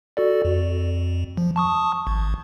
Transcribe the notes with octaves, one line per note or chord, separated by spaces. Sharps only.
F#4 A4 D5
F2
F3
A5 C#6 D#6
G#1